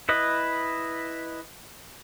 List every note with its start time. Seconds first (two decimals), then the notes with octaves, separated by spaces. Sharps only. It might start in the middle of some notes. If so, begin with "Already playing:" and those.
0.09 E4 B4 D#5